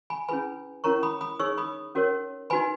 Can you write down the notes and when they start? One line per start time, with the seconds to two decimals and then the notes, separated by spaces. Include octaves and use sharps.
0.10 G#5 B5
0.28 C#4 E4 G#4 B4 G#5 B5
0.84 C#4 E4 A#4 C#5 A#5 C#6
1.03 B5 D#6
1.21 B5 D#6
1.39 D#4 G#4 C#5 C#6 E6
1.58 B5 D#6
1.95 C#4 F#4 A#4 C#5
2.50 D#4 F#4 B4 G#5 B5